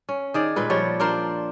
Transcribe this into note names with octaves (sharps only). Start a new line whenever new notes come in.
C#4
D#3 G#4 D5
A#2 G#3 B4
F3 G3 C#5
D4 F4 A#4 C5